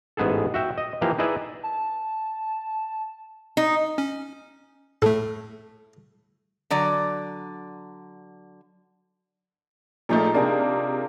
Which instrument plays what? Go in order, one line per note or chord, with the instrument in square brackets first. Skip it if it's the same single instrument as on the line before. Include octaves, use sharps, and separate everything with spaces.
[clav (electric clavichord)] A1 G#2 B3 G#4 A4
F#4 E5 G5
D#5
E3 F3 A#3 G4 F5
D#4 E4 G#4 B4 D5 E5
[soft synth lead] A5
[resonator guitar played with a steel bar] D#4
[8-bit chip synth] C#4
[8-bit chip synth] A2 A3 [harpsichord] A4
[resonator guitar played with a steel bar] D3 F#3 D5
[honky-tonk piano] A#2 F3 A3 [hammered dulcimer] D#4 G#4 A#4
[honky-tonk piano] C3 A#3 [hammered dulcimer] D4 F4 G#4